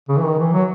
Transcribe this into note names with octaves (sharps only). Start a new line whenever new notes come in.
C#3
E3
D#3
E3
F#3